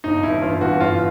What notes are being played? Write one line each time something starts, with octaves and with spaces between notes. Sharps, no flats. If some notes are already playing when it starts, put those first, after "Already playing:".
G1 D#4
G2 E3 E4
G1 F4
G2 E3 F#4
G1 F4